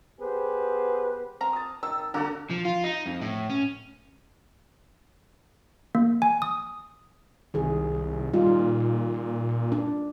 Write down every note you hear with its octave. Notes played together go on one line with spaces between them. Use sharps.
B3 G4 G#4 B4 C5
C4 A#4 A#5
A5 D#6
D#3 E6
D3 A#3 F#4 A4 A#4
F3
F4
D#4
F2
A2
C#4
A#3
G#5
D#6
C2 D#3 G#4
A#2 G3 D#4 F4
D4